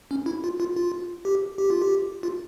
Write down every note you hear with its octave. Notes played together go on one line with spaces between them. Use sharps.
C#4
E4
F4
F4
F4
G4
G4
F4
G4
F4